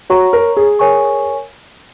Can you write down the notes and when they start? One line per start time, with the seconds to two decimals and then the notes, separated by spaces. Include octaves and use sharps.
0.10 F#4 C#5 A#5 C#6
0.33 A#4
0.57 G#4
0.79 A#4 C#5 G#5 C#6